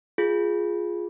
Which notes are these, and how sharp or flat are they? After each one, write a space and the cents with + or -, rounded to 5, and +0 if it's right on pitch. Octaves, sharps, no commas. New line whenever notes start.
F4 +0 G#4 +0